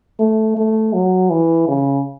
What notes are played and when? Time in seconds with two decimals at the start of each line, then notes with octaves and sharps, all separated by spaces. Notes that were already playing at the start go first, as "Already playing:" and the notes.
0.20 A3
0.57 A3
0.93 F#3
1.30 E3
1.68 C#3